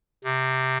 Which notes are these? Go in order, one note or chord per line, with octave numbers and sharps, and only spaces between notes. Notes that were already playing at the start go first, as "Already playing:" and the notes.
C3